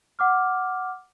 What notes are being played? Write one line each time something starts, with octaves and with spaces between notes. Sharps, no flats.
F#5 D6 F6